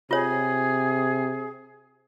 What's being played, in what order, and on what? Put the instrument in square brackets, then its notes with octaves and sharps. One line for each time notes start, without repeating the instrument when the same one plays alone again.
[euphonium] C3 [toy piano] F4 C#5 [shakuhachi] G#4